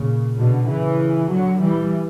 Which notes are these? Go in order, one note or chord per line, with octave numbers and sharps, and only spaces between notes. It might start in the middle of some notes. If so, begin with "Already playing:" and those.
Already playing: A#2 C#3
B2 D3
C#3 E3
D3 F#3
E3 G3